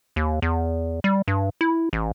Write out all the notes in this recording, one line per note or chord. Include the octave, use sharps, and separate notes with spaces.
D#2
E2
G3
G2
E4
A1